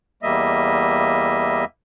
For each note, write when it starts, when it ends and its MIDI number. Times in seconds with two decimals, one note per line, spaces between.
0.23 1.65 40
0.23 1.65 55
0.23 1.65 58
0.23 1.65 75
0.23 1.65 76